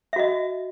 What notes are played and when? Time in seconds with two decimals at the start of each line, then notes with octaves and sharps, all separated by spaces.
0.13 E5
0.16 F#4
0.19 D#5